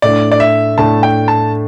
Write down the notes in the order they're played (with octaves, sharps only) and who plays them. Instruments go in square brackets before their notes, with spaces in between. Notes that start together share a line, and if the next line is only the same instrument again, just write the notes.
[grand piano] A2 A3 D4 [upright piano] D5
[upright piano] D5
E5
[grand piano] A2 A3 D4 [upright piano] A5
[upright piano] G5
A5